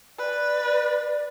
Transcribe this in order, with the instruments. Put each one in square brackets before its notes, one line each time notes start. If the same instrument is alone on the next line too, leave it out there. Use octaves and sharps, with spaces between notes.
[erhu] B4 [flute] D5